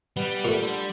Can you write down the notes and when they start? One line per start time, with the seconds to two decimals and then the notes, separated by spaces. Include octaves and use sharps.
0.17 G3 B3
0.45 A#2 A3
0.62 D3